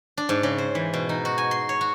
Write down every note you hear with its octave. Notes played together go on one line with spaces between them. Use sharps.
D4
G#2
C#3
C5
E3
B2
D#4
F#4
G#5
C6
C#5
F#4